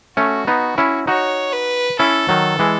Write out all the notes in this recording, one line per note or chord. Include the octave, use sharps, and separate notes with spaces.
A3 C#4 F#4
B3 D#4
C#4 E4
D#4 F#4 C#5
B4
C#4 E4 A4
D#3 F#3
E3 G#3